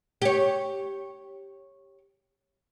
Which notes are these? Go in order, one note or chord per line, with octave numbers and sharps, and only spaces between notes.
G4 C#5